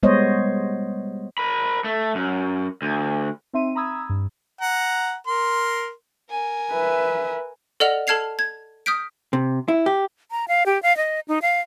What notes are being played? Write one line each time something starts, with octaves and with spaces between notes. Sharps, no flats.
G3 G#3 B3 C5 C#5 D#5
A#4 B5
A3
F#2
D2
C4 D#4 E5 C6 D#7
A#5 B5 D#6 E6 G#6
G2
F#5 A#5
A#4 C6
A#4 G#5
B4 E5
A4 D5 D#5 F#5 F6 F7
A4 A5 F6 G#6 C7 F7
G#6
D#6 F6 G6 B6 D7
C3
E4
G4
A#5
F5
G4
F5
D#5
D#4
F5